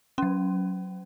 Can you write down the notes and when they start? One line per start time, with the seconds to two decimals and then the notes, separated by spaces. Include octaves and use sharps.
0.18 F#3 C#4